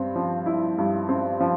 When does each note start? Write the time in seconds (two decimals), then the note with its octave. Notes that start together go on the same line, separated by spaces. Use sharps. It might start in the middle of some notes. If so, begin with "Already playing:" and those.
Already playing: G2 C4
0.16 F3
0.46 E4
0.78 G2
1.09 C4
1.40 F3